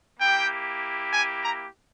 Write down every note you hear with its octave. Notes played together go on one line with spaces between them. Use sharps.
A#3 E4 G4 G5
G#5
A#5